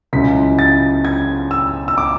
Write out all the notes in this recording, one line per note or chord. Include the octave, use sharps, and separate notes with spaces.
C#2 C#3 F#3 C#4 E4 B6
A6
G#6
E6
E6
D6